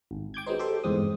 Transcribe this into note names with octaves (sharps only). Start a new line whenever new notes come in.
G#1
G5 D6 G6 G#6
F#3 G#3 B3 C4 D#4 C5
G4 A4 C5
G1 E2 G#2 C3 C4 D#6